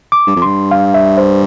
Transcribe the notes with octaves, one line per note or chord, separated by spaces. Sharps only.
D6
G2
F2
G2 C6
F5
E5
C5